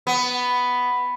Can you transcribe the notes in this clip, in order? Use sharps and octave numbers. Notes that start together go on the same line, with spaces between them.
B3